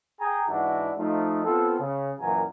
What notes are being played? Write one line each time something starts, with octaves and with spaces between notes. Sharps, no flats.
G#4 G5 G#5 A#5
G#2 E3 D4 E4 F#4
F3 A3 D#4
B3 C4 F4 A4
C#3
F#2 A#2 E3 F#4 G#5 A#5